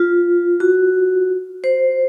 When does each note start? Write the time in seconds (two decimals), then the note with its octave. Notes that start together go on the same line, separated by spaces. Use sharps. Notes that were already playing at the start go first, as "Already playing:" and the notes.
Already playing: F4
0.60 F#4
1.64 C5